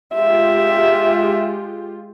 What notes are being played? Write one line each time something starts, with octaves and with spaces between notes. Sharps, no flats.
G#3 F4 G4 E5